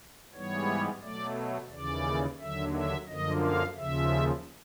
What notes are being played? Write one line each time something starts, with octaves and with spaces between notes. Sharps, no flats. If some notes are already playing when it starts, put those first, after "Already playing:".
G#2 E3 G3 B3 C#5
B2 F#3 A3 D5
D#2 C#3 E3 D5
D#2 D3 F#3 E5
E5
F#2 D3 F3 A#3 D#5
F5
D#2 C#3 F3 E5